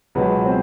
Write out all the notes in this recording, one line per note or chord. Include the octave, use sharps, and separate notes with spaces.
C#2 B2 F#3 B3 B4
C4 C5